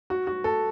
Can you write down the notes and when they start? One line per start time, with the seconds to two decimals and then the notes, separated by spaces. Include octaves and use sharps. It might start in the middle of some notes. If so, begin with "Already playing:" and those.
0.10 F#4
0.27 F#4
0.44 A4